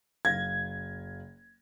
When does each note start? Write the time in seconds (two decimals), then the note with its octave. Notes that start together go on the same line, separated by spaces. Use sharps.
0.25 F#1 F5 G#6 A#6